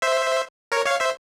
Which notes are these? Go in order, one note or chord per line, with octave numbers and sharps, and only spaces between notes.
C5 E5
A#4 C#5
C#5 F5
C5 E5